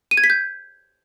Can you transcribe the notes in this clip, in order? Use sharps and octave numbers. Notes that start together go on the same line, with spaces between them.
D#7
G#6
B6
G6